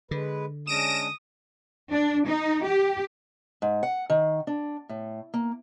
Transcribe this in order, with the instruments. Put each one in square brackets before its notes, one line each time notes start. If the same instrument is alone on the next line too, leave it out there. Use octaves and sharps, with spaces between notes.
[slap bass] D3 [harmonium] G#3 B4
[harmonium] G#3 C#4 D4 [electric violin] D#6 [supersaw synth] A#6 D7 E7
[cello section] D4
D#4
G4
[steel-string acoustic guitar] G#2
F#5
D#3
D4
A2
A#3